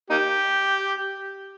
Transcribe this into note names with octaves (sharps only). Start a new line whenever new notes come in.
A#3 D#4 G4